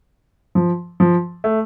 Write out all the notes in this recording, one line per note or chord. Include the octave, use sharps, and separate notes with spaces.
F3
F3
A3